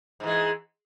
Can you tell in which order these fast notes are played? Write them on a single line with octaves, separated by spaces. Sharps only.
G#2 E3 G#3